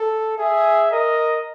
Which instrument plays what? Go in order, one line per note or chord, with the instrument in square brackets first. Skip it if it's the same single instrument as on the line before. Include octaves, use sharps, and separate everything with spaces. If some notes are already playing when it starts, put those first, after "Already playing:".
Already playing: [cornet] A4
[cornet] G#4 [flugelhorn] E5
[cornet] A#4 [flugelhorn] D#5